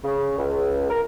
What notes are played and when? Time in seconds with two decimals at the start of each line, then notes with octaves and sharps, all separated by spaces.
0.04 C#3
0.38 C#2
0.91 A#4